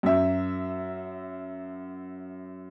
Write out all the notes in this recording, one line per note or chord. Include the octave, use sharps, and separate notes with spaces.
F#2 E5